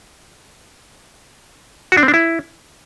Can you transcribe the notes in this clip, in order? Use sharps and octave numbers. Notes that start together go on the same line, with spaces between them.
F#4
D4
C4
D4
E4